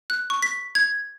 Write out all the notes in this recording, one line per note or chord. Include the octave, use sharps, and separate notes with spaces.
F#6
C#6
B6
G#6